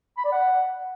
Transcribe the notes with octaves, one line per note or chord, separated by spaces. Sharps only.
B5
D5
F#5